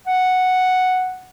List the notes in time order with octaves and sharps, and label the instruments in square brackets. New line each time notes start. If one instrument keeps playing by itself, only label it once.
[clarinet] F#5